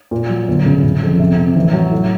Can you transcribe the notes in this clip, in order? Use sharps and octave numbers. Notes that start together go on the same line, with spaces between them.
A#2
F#3
G1
C#3
C#3
F2
C3
C3
A1
F#3
A2